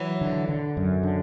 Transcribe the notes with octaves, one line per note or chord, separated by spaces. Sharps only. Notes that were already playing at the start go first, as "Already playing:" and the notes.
Already playing: E3 F#3
D3
D3
F#2
D3